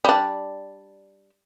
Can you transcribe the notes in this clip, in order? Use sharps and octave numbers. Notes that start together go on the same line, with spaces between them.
G3 D4